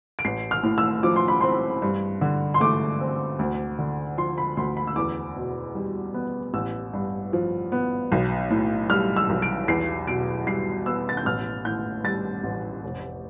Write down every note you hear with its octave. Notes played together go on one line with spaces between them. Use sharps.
D7
A1 C7
F6
A2
E6
F3 D6
C6
B5
C4 C6
G2
D3
C6
A3 D6
C4
D2
D3
F3 C6
B5
D2 C6
B5
E6
E2 D6
B2
G3
B3
A1 E6
G2
F3
B3
B1
A2
G3 F6
E6
B1
D7
E2 C7
B2 D7
G3 C7
B3 E6
A6
G6
A1 F6
A2 G6
G3 A6
A1
F1